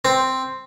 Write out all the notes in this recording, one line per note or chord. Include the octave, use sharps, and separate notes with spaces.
C4